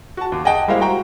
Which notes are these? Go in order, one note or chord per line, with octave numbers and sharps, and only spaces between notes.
F#4 A5
D#2
G#4 D#5 F#5 G5 A5
G3 G#3 A#3 E4 C5 F5
F#4 G5 A#5